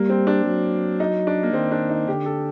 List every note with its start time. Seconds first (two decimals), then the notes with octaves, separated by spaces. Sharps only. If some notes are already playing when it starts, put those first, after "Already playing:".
Already playing: G3 A#3
0.09 C4
0.27 D4
0.46 F#3
1.00 D#4
1.27 D4
1.43 A#3
1.53 D#3 C4
1.71 D4
1.90 D#4
2.08 D3 G4
2.26 A4